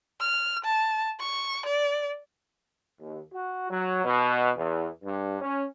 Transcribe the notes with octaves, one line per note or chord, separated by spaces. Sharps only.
F6
A5
C#6
D5
D#2
F#4
F#3
B2
E2
G2
C#4